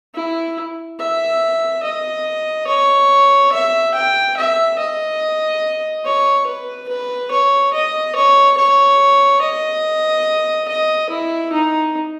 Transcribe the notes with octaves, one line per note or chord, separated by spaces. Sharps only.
E4
E5
D#5
C#5
E5
G5
E5
D#5
C#5
B4
B4
C#5
D#5
C#5
C#5
D#5
D#5
E4
D#4